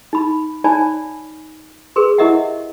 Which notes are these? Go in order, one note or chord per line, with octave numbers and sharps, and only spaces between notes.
D#4 B5
D#4 C#5 D5 G#5 A5 B5
G#4 A#4 B4 C6
E4 G4 A#4 D#5 E5 F#5